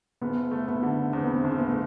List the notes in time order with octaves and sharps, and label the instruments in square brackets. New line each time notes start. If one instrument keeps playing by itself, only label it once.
[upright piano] F#1 [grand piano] B3
[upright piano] A3
[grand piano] B3
[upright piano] D3
[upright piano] E2 [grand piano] C4
[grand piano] B3
C4
[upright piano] F#1
[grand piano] B3
A3